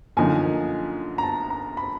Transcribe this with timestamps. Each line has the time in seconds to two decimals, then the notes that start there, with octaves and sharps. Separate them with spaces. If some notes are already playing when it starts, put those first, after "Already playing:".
0.17 F#2 D3 F3 A#3 D#4 G#5
1.18 A#5
1.23 A5
1.50 A#5
1.77 B5